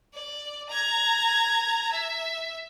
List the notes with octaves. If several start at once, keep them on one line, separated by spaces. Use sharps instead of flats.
D5
A#5 G#6
E5